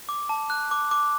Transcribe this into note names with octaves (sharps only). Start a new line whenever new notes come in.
D6
A5
F#6
D6
D6